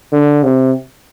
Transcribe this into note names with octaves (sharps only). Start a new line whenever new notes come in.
D3
C3